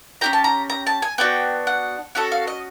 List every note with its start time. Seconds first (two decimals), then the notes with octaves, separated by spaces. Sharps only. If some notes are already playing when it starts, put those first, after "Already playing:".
0.21 C#4 E4 G4 A#5
0.33 A5
0.44 A#5
0.70 A#5
0.87 A5
1.02 G#5
1.18 B3 D4 F#4 G5
1.67 F#5
2.15 C#4 F#4 A4 F#5
2.32 F5
2.47 D#5